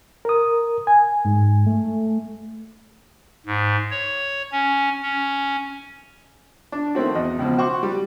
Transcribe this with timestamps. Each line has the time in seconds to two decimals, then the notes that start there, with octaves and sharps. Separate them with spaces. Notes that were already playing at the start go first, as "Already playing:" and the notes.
0.25 A#4 D#6
0.87 G#5
1.25 G#2
1.66 A3
3.46 G#2
3.91 C#5
4.52 C#4
5.02 C#4
6.72 D4
6.95 D#3 A3 C4 F#4
7.15 E2 D#5
7.39 C#2 B2 F3
7.58 F#4 C5 F#5 C#6 D6
7.83 G3